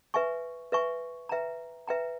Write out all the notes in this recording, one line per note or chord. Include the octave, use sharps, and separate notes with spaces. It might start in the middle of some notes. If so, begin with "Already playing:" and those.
B4 E5 G#5 C#6
B4 E5 G#5 C#6
B4 E5 G5 A#5
B4 E5 G5 A#5